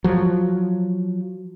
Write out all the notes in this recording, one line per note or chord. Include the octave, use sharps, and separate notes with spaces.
F3 F#3